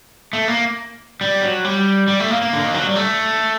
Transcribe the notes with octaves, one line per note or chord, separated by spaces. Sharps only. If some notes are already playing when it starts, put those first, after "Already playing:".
A3
A#3
G3
F#3
G3
G3
A3
A#3
A#3
D3
D#3
F#3
G3
A3